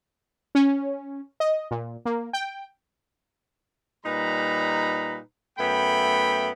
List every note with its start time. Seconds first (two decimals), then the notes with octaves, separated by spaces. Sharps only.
0.55 C#4
1.40 D#5
1.71 A#2
2.05 A#3
2.33 G5
4.05 A#2 G3 D#4 B4 A#5 B5
5.58 F#2 A3 B3 E5 G5 B5